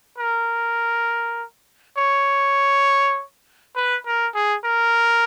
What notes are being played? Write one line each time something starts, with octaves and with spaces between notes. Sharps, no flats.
A#4
C#5
B4
A#4
G#4
A#4